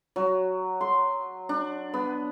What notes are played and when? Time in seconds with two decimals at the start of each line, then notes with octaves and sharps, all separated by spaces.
0.16 F#3
0.81 C6
1.49 D4
1.94 B3